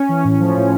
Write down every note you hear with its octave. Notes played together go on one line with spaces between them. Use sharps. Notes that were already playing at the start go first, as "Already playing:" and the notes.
Already playing: C#4
E3
A2
F3
A2